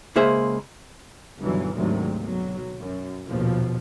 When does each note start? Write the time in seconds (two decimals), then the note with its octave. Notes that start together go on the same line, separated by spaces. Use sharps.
0.16 C#2 A#3 G#4 C5 E5
1.39 G1 D#2 B2 E3 F#3
1.75 D2 G#2 C3 D#3 F#3
2.21 B1 F#3
2.80 F#2
3.26 A#1 D#2 B2 F3